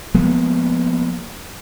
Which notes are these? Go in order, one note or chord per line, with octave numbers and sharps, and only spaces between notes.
F3 G#3 A#3 B3